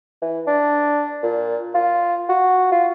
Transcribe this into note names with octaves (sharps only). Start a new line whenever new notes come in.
E3
D4
A#2
F4
F#4
F4